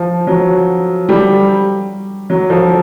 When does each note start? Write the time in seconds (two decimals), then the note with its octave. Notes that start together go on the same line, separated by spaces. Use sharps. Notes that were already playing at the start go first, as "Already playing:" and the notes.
Already playing: F3
0.27 F#3
1.09 G3
2.30 F#3
2.50 F3